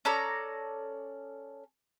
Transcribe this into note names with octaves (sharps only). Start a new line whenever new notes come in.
C#4 A4 D5 A#5